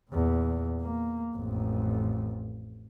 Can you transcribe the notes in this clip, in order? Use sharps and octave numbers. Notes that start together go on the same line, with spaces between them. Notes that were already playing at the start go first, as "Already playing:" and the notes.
E2 A#2
A#3
A1 F2